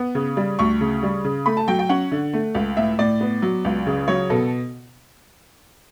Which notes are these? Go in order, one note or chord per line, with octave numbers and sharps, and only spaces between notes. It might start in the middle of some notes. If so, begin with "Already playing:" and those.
Already playing: B3
C#3
G3
D2 C#6
C#3
G3
C#3
A3 B5
A5
F#3 G5
G5
C#4 F#5
D3
A3
C#2
A2 E5
A2 D5
B3
F#3
C#2
C#3
F#3 C#5
B2 A4